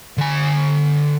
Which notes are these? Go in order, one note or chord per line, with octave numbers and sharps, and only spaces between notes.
D3 G#5